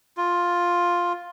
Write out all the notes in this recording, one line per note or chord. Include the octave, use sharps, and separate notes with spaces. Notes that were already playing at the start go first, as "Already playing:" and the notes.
F4